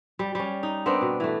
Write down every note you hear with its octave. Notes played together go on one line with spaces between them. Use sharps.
G3
G3 C#4
D#4
B3 C4 D4 A#4
B2
E3 A3